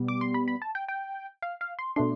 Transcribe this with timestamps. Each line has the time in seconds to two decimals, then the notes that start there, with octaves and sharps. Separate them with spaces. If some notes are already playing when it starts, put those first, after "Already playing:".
Already playing: B2 G3 B3
0.08 D6
0.21 C6
0.34 B5
0.48 B5
0.62 A5
0.75 G5
0.88 G5
1.42 F5
1.61 F5
1.79 C6
1.96 B2 A3 D4 C6